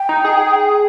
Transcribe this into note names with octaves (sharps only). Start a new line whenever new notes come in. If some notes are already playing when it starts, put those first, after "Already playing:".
Already playing: G5
D#4
G#4